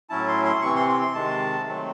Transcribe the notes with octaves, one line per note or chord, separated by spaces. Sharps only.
A2 F#3 C#4 E4 A5
C6
C6
C3 E3 C4 C#6
C6
C6
C6
C3 D#3 G#3 A5
D#3 F#3 A3 C4